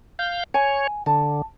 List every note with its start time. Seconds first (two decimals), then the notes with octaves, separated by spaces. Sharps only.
0.19 F5 G6
0.54 C#5 G#5
1.06 D3 A5